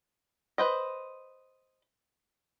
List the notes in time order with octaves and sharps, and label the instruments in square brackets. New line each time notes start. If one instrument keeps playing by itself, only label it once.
[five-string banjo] B4 C5 D#5